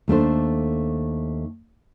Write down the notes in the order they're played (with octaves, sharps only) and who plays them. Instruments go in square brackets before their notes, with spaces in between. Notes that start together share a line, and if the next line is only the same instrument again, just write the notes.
[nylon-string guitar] D#2 A3 D4 C5